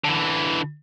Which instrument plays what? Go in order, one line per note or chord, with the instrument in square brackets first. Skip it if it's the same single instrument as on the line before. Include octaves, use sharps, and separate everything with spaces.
[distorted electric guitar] D3 E3